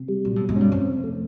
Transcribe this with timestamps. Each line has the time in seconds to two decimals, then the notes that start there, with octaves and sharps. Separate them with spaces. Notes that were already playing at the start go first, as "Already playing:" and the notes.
Already playing: C3
0.08 G3
0.25 A#2 F#3
0.36 A2
0.41 B2
0.49 G#2
0.56 G2 C#4
0.72 F2 C4
0.87 C3
1.04 A3